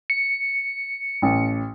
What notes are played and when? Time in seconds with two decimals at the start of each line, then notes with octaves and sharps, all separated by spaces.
0.10 C#7
1.22 A1